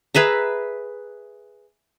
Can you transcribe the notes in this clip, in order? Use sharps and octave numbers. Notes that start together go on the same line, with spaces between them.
G#4 B4 E5 A#5